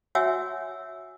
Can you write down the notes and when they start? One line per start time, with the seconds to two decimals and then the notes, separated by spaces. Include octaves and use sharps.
0.15 F#4 C#5 E5 F#5 G#5 E6